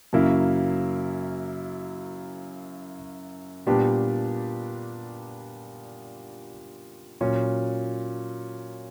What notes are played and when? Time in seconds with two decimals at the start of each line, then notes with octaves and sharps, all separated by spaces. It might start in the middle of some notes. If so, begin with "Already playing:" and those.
0.13 F#2 C#3 F#3 A#3 E4
3.67 A#2 G3 B3 D4 G4
7.21 A#2 F#3 C#4